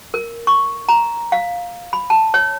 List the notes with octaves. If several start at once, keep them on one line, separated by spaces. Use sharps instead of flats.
A#4
C#6
A#5
F5
B5
A5
C#5